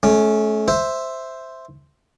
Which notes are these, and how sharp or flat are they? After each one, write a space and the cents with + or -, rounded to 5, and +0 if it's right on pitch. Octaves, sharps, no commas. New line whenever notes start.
A3 -35 C#4 +0
C5 +0 E5 +0